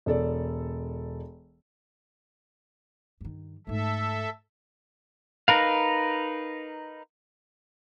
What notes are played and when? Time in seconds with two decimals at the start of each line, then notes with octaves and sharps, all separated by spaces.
0.06 E1 A4 D5
3.21 G2 D#3
3.67 G#2 A3 A4 E5
5.48 D#4 A#4 B4 F5